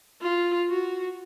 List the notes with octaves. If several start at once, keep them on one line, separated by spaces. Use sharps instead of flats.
F4
F#4